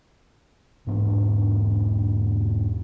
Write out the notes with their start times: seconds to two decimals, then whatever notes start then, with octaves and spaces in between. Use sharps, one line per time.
0.87 E1 G#2 B3 D4